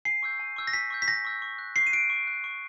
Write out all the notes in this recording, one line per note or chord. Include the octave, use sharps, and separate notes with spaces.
G#5 C7
C#6 E6 G6
G#5
C#6 E6 G6
A#6
G#5 B6
C#6 E6 G6
B6
G#5 A#6
C#6 E6 G6
C#6
F#6
C#6 C7
D#7
F#6 D7
C#6
F#6
C#6